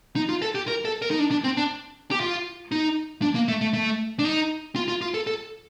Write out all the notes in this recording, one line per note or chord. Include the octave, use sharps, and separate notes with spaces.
D#4
F4
A4
G4
A#4
A4
A#4
D#4
D4
D4
C4
D4
G4
F4
D#4
D4
A#3
A3
A3
A3
D4
D#4
F4
F4
F4
A4
A4